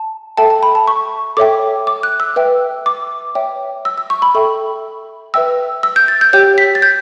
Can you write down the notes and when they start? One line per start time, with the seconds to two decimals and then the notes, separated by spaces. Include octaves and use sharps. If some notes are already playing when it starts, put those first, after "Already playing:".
Already playing: A5
0.37 A4 E5 G5 A5
0.50 A5
0.63 B5
0.75 A5
0.87 C#6
1.37 A4 C#5 E5 G5 D6
1.87 D6
2.03 F#6
2.20 E6
2.36 B4 E5 G5
2.86 D6
3.35 C#5 E5 G5
3.85 E6
3.98 E6
4.10 C#6
4.22 B5
4.35 A4 E5 G5 C#6
5.34 B4 E5 G5 E6
5.83 E6
5.96 G6
6.08 A6
6.21 G6
6.33 G4 C#5 G5 G6
6.58 B6
6.75 A6
6.82 G6